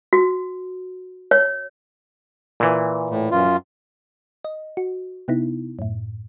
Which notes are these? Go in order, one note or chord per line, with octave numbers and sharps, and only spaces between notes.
F#4
C#5
A#2 E3
A2
F#2 F4
D#5
F#4
C3 B3 D#4 E4
F#2 A2